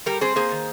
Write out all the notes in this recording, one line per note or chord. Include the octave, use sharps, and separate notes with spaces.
G3 G4 A#4
C4 G#4 C5
A#3 G#4 C5
D#3